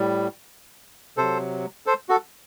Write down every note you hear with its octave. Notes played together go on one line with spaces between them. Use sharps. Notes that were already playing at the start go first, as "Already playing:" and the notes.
Already playing: A2 G3
C3 F#3 A4 C5
A4 C5
F#4 A4